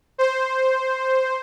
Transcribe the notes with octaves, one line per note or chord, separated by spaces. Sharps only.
C5